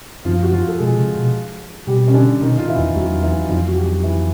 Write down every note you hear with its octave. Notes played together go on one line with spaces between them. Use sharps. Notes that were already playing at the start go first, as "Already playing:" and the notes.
F#2 F3 F4
F#4
F3 F4
A4
B2 G#3 G#4
C3
B2
B2 G3 G4
C#4
D3 D4
B2 D#3 D#4
A#2 F4
E3 E4
E2
E2 F#3 F#4
E3 E4
F2 F3 F4
F#3 F#4
G4
F#3 F#4
E3 E4